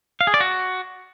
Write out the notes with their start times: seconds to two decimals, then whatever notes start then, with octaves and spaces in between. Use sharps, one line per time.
0.21 F5
0.27 G#4
0.34 D5
0.40 F#4